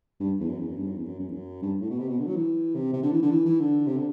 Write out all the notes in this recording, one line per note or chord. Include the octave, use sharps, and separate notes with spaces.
G2
E2
F#2
E2
F#2
G2
F#2
E2
F#2
F#2
E2
F#2
G2
A2
B2
C3
B2
D3
F#3
E3
C3
C3
D3
E3
D3
E3
E3
D3
C3
D3